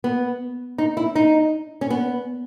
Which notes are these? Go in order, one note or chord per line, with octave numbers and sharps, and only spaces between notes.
B3
D#4
E4
D#4
C#4
B3